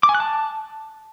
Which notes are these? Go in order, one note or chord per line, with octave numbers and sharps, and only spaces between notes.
D6
G#5
F#6
A5